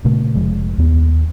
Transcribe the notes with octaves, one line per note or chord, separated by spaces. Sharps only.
A#2 C#3 A3
F1 F3 G#3
D#2 B3